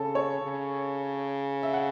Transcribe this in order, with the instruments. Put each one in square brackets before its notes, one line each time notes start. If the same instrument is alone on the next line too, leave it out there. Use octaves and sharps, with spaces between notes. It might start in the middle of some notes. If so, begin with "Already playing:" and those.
Already playing: [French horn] C#3 [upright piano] A4
[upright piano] C#5
[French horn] C#3
[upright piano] E5
F#5